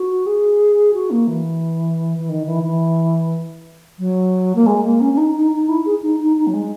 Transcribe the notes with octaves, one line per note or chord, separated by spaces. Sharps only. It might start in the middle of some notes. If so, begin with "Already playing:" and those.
Already playing: F#4
G#4
F#4
A#3
E3
E3
D#3
E3
E3
F#3
A#3
G#3
A#3
C#4
C#4
D#4
D#4
D#4
E4
G#4
D#4
D#4
D#4
F#3
G#3